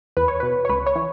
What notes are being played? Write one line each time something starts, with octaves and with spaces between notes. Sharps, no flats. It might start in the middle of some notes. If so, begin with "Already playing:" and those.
E2 B4
C#5
B2 B4
C#5
C#2 B4
C#5
E3